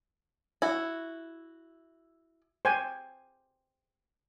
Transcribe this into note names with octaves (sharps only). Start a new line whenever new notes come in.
E4 F#4
C5 G5 G#5